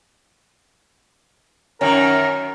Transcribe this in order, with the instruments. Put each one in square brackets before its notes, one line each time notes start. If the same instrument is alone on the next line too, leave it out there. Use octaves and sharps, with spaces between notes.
[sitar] F#2 D#3 [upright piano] C#4 [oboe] A#4